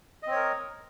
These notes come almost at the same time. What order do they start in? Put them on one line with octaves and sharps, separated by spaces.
D#5 C4 C#5 A#4